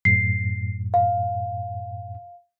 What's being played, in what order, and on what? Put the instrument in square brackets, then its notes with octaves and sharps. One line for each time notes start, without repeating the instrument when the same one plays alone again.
[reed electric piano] F#2 A2 [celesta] C7
[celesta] F5